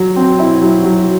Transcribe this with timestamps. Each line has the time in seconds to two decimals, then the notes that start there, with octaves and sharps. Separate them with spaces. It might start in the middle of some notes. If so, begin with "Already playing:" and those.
Already playing: F#3
0.16 C4
0.39 E4
0.61 F#3
0.84 F#3